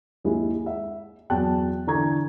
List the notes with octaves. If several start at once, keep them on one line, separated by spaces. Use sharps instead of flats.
D#2 G#3 E4
E5
E2 F#3 G5 A5 F#6
D3 E3 A#5 C#6 G#6